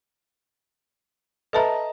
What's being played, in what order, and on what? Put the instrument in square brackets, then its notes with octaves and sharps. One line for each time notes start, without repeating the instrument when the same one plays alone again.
[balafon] A4 B4 E5 [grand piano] D#5 A5 A#5